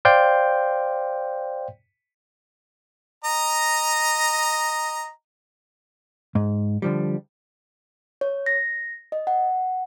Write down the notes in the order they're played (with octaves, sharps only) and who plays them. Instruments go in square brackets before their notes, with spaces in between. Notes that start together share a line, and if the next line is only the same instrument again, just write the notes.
[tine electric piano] C5 D5 F5 G5 G6
[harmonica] D#5 A#5
[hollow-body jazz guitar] G#2
D3 F3 G3
[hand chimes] C#5
A#6
D#5
F#5